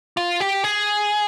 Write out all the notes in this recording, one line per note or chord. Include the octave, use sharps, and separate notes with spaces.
F4
G4
G#4